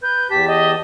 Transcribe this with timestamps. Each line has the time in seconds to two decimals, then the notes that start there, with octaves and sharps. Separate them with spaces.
0.03 B4 G6
0.30 E2 G4 A5 B6
0.48 D#5